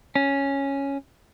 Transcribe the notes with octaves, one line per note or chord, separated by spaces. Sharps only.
C#4